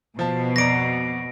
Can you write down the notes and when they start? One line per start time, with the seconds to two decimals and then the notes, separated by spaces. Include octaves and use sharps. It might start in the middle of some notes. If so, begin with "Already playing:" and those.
0.19 B2 F3 A5
0.56 F2 D5 A#5 A#6 D7